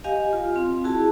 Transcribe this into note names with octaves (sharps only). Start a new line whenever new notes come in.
G4 D#5 F5 G#5
F4
C4
E4 F#4 G#4 A5